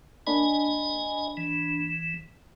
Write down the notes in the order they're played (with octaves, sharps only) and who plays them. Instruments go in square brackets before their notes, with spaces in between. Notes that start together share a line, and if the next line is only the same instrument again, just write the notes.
[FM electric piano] A#3 D4 B5 [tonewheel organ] D#5 G#5
[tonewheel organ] E3